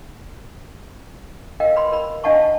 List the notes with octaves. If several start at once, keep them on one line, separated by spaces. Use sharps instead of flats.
A#4 D#5 F5 G5
B4 B5 C6
A#4 B5
D4 D#5 F5 F#5 A5 C#6
A5